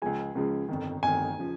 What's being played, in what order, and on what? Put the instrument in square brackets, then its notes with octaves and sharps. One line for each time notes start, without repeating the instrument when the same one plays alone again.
[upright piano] C#2 C#3 F3 G#3 [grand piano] G#5
[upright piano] C#2 C#3 F3 G#3
G1 F2 D#3
[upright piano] G1 F2 D#3 [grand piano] G#5
[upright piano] C#3 F3